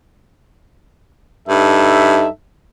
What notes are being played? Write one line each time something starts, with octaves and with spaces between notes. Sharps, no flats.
G2 D#4 A4 E5